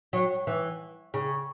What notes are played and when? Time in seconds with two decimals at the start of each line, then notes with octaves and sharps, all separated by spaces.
0.13 F#3
0.47 E3
1.14 C#3